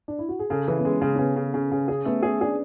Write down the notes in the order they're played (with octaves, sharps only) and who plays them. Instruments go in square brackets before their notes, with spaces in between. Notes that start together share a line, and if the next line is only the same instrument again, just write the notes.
[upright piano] D4
E4
F#4
G#4
[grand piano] C#3 [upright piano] A4
[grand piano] E3 [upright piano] C#4
[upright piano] B3
[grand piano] G#3 [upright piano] C#4
[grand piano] C#3 [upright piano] C#4
[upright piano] C#4
[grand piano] C#3 [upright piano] B3
[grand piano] C#3
[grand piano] C#3 [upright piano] C#4
[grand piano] C#3
[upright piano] C#4 [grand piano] G#4
[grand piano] A3 [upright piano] B3
[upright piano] C#4 [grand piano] G#4
[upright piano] D4 [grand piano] G#4